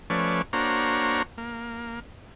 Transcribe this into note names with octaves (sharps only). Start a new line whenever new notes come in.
F3 A3 C#4 B4 C#5 D5
A#3 D4 F#4 C5 C#5 A#5
A#3